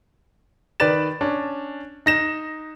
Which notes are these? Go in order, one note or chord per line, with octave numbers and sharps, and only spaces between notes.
D#3 B4 D5 B5 A6 E7
C#4 D4
D#4 A#6 E7